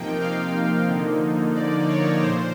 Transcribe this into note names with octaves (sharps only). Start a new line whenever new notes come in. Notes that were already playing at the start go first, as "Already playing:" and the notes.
Already playing: C3 F3 A#3 D#4 G5
F5
D3 F3 A#3 D#4
D5
C#5
A#2 F3 C5